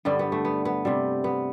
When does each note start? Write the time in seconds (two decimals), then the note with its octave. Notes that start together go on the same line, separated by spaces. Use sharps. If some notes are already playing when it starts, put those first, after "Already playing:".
0.05 G2 D3 G3 B3
0.19 B3
0.32 A3
0.45 B3
0.65 B3
0.85 C3 G3
1.24 B3